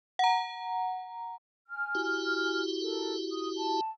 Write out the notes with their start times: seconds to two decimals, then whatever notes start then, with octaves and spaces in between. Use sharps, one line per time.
0.19 F#5 A#5
1.68 G#5 F6
1.95 E4 F#4 G4
2.81 A4 A#4
3.33 D#6
3.56 A5